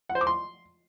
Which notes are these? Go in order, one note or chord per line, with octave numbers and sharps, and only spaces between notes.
F#5
C5
D6
C6